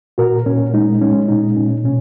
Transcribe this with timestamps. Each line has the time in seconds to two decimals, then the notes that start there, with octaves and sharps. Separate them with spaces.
0.18 A#2 F#4 A#4
0.46 A#2 C#4
0.74 G#3 D#4
1.02 G#3 C#4
1.29 A#2 D#4
1.57 A#2 C#4
1.84 B2 C#4